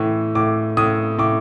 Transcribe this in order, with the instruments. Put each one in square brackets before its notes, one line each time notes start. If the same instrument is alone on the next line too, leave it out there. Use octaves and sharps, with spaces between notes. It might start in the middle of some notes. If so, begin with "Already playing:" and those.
Already playing: [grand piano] A2 E3
A2 D6
A2 D#6
A2 D6